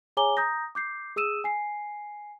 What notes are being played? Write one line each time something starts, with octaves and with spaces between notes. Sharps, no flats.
G#4 C#5 G#5 A#5 D6 G7
A#5 D#6 G6 A#6
D6 G6 C7
G#4 D#6 E6 D#7 E7
G#5 C7